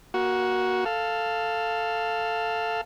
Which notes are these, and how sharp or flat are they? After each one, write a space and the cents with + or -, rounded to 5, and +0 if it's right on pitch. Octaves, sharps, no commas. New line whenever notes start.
A#3 +25 F#4 +0
A4 +5 F5 +0